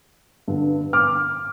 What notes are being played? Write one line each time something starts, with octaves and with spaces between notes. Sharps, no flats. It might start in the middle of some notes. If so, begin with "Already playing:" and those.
G2 D3
D6 F6